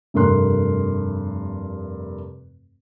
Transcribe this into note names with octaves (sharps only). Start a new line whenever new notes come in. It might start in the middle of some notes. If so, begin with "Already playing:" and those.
F1 G2 A3 A#4 C6 F#6